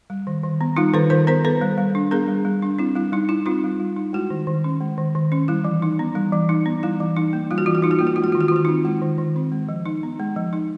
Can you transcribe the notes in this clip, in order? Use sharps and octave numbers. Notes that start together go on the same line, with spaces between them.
G3
D#3
D#3
B3
G3 D#4 F4
D#3 A4 B4
D#3 A#4 C5
B3 A#4 C5
B3 A4 B4
G3
G3
D4
B3 G#4 A#4
G3
G3
D4
C4 E4
G3 E4
G3 D#4
D#4 E4
C4 D#4 F4
G3
G3
D#4
G#3 E4 F#4
D#3
D#3
C#4
G#3
D#3
D#3
C#4
G3 E4
E3
D#4
B3
G3
E3
D#4
B3
G3 E4
E3
D#4
A#3
G3 F4
F#4
E3 F4
F#4
D#4 F4
F#4
A#3 F4
F#4
G#3 F4
F#4
D#3 F4
F#4
F4
D#3 F#4
C4 D#4 F4
G#3 E4
D#3
D#3
C4
G#3
F3
D#4
B3
G#3
F3
D#4